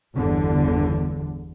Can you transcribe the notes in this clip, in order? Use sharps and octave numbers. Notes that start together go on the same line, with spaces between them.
G1 E2 D3